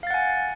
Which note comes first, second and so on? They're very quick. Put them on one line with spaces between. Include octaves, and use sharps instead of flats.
F5 A6 F#5 G#5